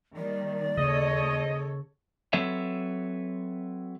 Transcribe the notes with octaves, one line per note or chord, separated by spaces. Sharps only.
D#3 G3 A#3 D5
D#2 C#3 A4 C#5 D#5
F#3 C4 A4 B4 C#5 E5